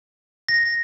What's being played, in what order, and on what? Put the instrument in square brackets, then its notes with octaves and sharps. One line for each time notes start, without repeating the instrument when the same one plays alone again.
[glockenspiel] A#6